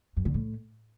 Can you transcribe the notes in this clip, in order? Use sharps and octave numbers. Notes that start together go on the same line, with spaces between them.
F#2
D3
A2